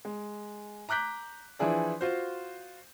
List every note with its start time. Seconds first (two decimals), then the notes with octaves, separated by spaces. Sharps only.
0.05 G#3
0.89 A#5 D6 F#6 G6 B6
1.59 E3 F3 D4 E4 G#4 D5
2.01 F4 F#4 C5